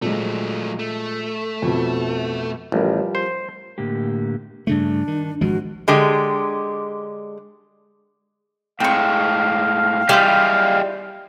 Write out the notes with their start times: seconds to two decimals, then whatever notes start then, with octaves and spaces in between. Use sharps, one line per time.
0.02 A#2 F3 F#3 G#3 A3
0.79 A3
1.62 F2 B2
2.72 A1 F3 G3 A#4
3.15 C5
3.78 A2 D3 A#3 G4
4.67 G2 C#3 A3 D4
5.07 D#3
5.41 G#1 F3 G#3 F#4
5.88 D3 G#3 G4
8.80 A2 G#3 C4 F5 C#6
10.09 G3 E4 F4 G4 G#4 D#5 G6